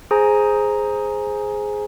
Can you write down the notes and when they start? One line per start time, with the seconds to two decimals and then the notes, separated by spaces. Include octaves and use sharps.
0.11 G#4 C5 G#5 A#5